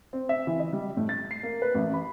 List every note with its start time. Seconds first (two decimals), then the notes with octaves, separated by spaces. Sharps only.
0.13 C4
0.29 E5
0.47 E3
0.60 D#5
0.73 G3
0.97 A2
1.09 A6
1.31 C7
1.43 A#3
1.62 B4
1.75 A1
1.94 B5